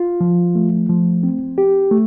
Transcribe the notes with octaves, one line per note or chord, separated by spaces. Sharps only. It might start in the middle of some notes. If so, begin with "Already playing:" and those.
Already playing: F4
F3
A3
F3
C4
G4
A3